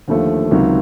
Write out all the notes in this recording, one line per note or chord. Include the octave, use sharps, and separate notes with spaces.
D#2 D3 F3 A3
C#2 C3 D#3 F#3